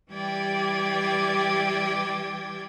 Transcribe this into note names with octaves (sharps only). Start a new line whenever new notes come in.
E3 G3 G4 D5 G5 G#6